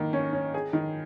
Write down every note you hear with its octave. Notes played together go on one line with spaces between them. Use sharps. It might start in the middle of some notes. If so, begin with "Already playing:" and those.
Already playing: D#3 A#3
C#4
C#4
G#4
D#3